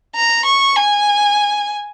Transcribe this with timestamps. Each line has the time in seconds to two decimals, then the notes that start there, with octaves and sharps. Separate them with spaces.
0.15 A#5
0.46 C#6
0.76 G#5